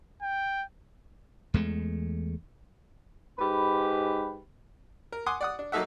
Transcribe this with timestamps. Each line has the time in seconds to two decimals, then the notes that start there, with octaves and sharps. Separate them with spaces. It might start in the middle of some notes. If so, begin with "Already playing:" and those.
0.22 G5
1.54 E2 G#3 A3
3.38 G#2 G4 B4 B5
5.12 A#4
5.26 F#5 G#5 C6 D6 D#6
5.41 D5 F#5 D#6
5.59 D4
5.72 F#3 A#3 D#4 A4 E5 F#5